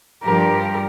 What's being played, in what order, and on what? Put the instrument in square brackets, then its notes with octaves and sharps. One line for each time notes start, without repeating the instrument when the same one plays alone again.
[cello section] G2 F3 G4 [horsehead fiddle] A#4